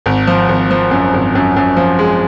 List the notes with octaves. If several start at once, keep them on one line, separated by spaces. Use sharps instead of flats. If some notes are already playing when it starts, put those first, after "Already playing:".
G#1
F3
G#1
F3
F#2
G#1
F#2
F#2
F3
G#3